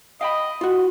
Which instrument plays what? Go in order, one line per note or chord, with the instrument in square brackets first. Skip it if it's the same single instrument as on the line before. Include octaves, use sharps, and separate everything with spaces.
[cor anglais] D#5 [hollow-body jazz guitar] F5 G5 B5
[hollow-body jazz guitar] F4 F#4